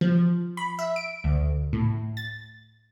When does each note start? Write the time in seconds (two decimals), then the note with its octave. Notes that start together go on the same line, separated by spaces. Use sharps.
0.01 F3
0.57 B5
0.79 E5
0.96 D7
1.24 D2
1.73 A2
2.17 A6